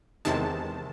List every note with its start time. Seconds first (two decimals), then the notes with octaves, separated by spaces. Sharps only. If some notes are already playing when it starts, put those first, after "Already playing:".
0.25 E2 C3 D#3 G#3 A5